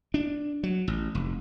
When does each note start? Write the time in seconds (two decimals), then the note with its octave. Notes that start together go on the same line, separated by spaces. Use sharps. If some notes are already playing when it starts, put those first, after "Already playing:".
0.14 D4
0.63 F#3
0.88 A1
1.15 F1